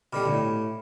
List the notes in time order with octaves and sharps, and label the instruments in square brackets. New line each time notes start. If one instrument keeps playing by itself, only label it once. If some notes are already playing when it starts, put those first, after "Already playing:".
[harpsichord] B2 D3 G3 [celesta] B5 D6 F6
[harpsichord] A2